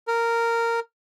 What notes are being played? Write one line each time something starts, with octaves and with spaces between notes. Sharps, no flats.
A#4